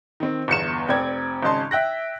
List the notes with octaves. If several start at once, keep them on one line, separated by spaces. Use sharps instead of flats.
D#3 C4
G1 E2 C#7 E7
F1 C4 D5 G5 G#6
G#1 C#3 D#5 A5 C6
E5 G5 F#6 A#6